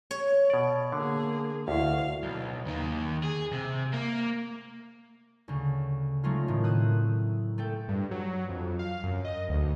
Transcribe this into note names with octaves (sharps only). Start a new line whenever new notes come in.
C#5
B2 D5
D3 A#3 G#4
D2 E4 F#4 F5
B1
D#2 D#3
G#4
C3
A#3
D2 C#3
F#3 G#3 A3 C#4 D#4 F4
A2 D#3
C4 D#6 E6 F#6
A3 A4 G5
G2
F#3
F2
F5
F#2
D#5
D2